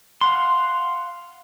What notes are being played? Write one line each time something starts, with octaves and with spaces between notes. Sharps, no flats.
F5 F#5 C6